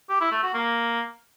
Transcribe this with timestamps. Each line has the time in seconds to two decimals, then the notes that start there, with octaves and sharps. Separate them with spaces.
0.09 G4
0.20 E4
0.31 A3
0.43 F#4
0.54 A#3